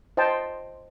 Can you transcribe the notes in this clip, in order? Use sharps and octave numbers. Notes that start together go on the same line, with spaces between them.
C5 D#5 G5 A5